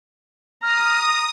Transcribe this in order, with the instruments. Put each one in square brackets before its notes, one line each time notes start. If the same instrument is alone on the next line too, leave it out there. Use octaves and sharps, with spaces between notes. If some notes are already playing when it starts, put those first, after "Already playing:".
[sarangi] A#5 [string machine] D#6 [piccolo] F6